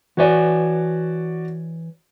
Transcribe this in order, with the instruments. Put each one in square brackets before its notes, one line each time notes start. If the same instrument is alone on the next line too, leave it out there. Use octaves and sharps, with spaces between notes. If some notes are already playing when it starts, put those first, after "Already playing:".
[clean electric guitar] E3 C#5 G#5 [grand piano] F#4 D5